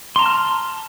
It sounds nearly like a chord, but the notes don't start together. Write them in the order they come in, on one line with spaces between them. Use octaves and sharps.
C6 A#5 A5 F6